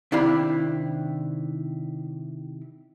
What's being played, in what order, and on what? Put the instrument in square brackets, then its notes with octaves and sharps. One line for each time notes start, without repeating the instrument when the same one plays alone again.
[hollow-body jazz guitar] C3 D#3 D4 E4 F5 B5